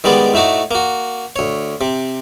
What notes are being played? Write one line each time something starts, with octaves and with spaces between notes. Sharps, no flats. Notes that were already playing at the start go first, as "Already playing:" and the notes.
D#3 G3 G#3 B3 D5
A2 A3 D#4 F#4 D6
A#3 F#4
D2 C#5
C3